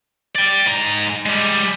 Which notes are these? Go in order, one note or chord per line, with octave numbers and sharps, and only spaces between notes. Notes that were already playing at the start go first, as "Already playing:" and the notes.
D5 G5
G#2 A#5
G3 G#3